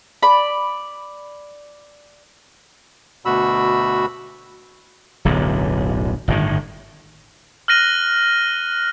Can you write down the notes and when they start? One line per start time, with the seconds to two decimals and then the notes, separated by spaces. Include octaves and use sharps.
0.23 D5 B5
3.25 D2 B2 F#4 B5 E6
5.25 D1 B1 F#2 D3
6.28 G1 A2 D#3
7.68 F6 F#6 A#6 D#7 F#7 G7